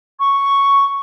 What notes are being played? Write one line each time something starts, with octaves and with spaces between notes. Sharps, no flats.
C#6